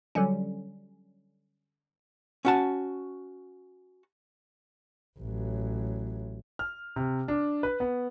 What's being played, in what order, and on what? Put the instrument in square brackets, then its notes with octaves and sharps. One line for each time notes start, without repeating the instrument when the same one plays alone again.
[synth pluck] D3 F#3 G3 C#4
[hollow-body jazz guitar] C#4 F#4 A5
[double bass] A1 F#3
[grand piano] F6
C3
D4
B4
B3